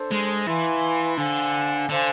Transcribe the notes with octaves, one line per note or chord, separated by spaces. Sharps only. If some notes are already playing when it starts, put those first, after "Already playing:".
Already playing: D4 A4 C5
G#3
E3 B4 F5 G#5 C6
D3 C5 F5 G#5
D3 A4 C5 F5 G#5